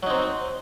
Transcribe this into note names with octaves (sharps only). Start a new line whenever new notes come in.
F#3 C4 D#4